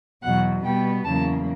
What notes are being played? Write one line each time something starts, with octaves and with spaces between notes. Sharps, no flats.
E2 B2 F#3 F#5
B2 G3 B3 G5
E2 C#3 F#3 A#3 A5